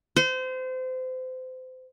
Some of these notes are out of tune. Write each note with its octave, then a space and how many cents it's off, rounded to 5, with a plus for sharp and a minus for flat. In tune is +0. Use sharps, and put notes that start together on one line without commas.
C5 -30